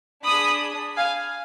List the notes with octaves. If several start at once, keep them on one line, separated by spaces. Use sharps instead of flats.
D4 G#4 B5 D#6
F5 G#5